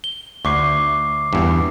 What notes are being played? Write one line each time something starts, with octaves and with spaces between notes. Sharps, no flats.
G7
D2 C#6 D6 C7
E2 G2